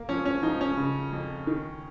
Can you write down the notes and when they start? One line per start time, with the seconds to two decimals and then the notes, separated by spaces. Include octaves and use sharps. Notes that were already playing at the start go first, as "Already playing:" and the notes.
Already playing: A#3
0.09 F3 C#4
0.25 C#4
0.43 F3 D#4
0.61 C#4
0.77 C#3
1.13 F2
1.47 D#3